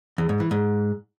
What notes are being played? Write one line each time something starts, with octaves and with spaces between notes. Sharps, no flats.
E2
G#2
E3
G#2